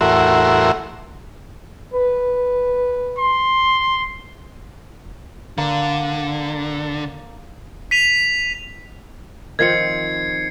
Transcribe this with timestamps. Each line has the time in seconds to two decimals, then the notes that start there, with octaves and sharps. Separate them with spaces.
0.01 E2 A2 F#4 A#4 E5 C6
1.94 B4
3.18 C6
5.58 D3 A#3
7.91 B6 D#7 F7
9.59 D#3 F3 C4 G#6 C7 C#7